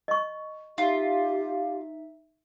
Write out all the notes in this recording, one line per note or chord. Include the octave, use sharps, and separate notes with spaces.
D#5 C#6
D#4 F4 G4 E5